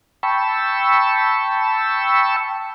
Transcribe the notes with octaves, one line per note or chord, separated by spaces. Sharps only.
G5 A5 B5 C#6 E6